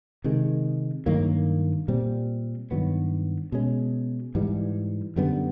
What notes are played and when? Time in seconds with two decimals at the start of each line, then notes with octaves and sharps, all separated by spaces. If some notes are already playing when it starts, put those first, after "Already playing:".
0.24 C3 D#3 G#3
1.06 G2 D#3 F#3 A#3
1.88 A#2 G3 C4
2.71 G2 D#3 F#3 B3
3.52 B2 G#3 C#4
4.35 G#2 E3 G3
5.16 F#2 D3 G3 B3